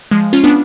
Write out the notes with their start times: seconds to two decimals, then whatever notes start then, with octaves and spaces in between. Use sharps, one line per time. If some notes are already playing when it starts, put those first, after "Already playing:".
0.11 F3 G#3
0.33 C#4 F4
0.44 B3 D4